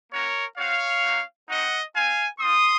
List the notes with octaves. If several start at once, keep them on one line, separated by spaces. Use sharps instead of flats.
A#3 C#4 F#4 A#4 C#5
C4 F#4 C#5 F5
A#3 D#4 F#4
C4 D#4 F#4 D#5 F#5
C4 F4 F5 G#5
C4 F4 C6 D#6